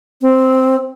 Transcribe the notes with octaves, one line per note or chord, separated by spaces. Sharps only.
C4